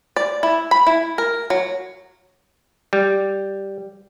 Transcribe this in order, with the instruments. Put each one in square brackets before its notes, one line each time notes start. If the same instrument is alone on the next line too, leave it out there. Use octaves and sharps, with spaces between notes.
[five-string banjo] D5
E4
B5
E4
A#4
F#3
[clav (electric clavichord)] G3